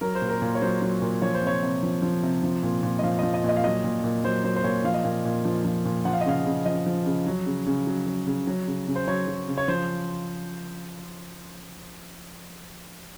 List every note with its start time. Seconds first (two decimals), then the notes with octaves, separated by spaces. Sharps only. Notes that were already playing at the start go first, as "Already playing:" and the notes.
0.01 F#3 A#4
0.15 C5
0.22 A#2
0.29 A#4
0.42 A#2
0.55 C#5
0.62 F#3 C5
0.82 F#3
1.02 A#2
1.22 F3 C#5
1.34 C5
1.42 C3 C#5
1.63 C3
1.83 F3
2.02 F3
2.23 C3
2.43 F3
2.63 A#2
2.83 A#2
2.99 D#5
3.03 F3 F5
3.19 D#5
3.23 F3
3.34 D#5
3.44 A#2 D#5
3.57 F5
3.64 F#3 D#5
3.84 A#2
4.04 A#2
4.24 F#3 C5
4.44 F#3 C5
4.56 C5
4.64 A#2 C#5
4.84 F3 F5
4.94 D#5
5.03 A#2 F5
5.25 A#2
5.45 F3
5.65 F3
5.85 A#2
6.05 F3 F#5
6.13 F5
6.21 D#5
6.26 C#3 F5
6.46 C#3
6.66 F3 D#5
6.86 F3
7.06 C#3
7.27 F#3
7.46 C#3
7.67 C#3
7.87 F#3
8.07 F#3
8.27 C#3
8.47 F#3
8.68 C#3
8.88 C#3
8.96 C5
9.07 F#3 C#5
9.28 F#3
9.48 C#3
9.58 C#5
9.68 F3 C5